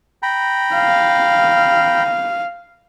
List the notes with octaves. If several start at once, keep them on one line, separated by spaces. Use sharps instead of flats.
G5 A#5 B5
F5